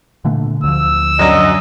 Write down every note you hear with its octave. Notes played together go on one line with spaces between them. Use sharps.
A#2 D3 A3
D2 F3 E6
F#2 F#3 D4 D#5